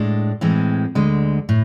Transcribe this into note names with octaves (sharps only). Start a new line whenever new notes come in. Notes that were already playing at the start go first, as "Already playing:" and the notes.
Already playing: A2 G#3 D4
A2 E3 G#3 C4
D2 D3 G#3
A2